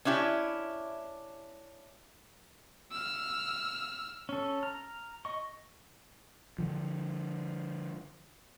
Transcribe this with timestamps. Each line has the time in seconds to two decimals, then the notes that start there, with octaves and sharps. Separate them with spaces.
0.05 C#4 D4 E4 G4
2.92 E6 F6
4.29 C#4 A4
4.63 A#5 F6
5.25 D#5 C#6
6.58 D3 F3